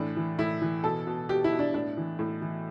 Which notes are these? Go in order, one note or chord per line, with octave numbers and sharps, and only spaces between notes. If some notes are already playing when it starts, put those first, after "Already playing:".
Already playing: A2 E3 D4
E3
A2 E4
E3
B2 A4
B2
B2 G4
E4
B2
D4
A2 D4
E3
A2
E3